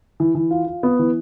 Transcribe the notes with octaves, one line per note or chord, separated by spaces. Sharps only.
E3
E3
F4
F4
B3
E3